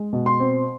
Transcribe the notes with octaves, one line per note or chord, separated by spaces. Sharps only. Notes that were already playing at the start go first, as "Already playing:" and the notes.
Already playing: G#3
B2
C6
C4